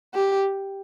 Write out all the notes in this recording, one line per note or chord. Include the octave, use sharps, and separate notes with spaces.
G4